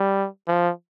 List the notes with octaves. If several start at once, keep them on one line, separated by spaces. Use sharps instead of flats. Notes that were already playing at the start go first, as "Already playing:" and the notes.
Already playing: G3
F3